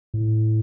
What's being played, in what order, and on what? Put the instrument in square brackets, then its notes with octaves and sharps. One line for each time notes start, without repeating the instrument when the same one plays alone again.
[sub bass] A2